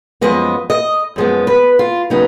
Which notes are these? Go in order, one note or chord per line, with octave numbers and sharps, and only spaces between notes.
F#2 F3 G#3 B3 D#5
D#5
F#2 F3 G#3 B3
B4
F4
C#3 F#3 B3 D#4